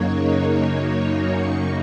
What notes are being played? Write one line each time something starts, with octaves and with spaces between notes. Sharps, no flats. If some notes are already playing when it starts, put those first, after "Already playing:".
Already playing: F#2 C#3 F#3 A#3 D#4 C#5
C#6